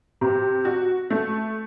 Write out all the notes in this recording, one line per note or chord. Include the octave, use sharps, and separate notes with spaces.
C3
F#4
A3